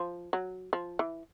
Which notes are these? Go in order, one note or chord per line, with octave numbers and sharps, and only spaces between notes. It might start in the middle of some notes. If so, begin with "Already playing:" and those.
Already playing: F3
F#3
F3
E3